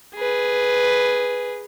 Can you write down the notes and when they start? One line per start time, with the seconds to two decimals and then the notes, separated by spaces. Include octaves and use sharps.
0.15 G#4 B4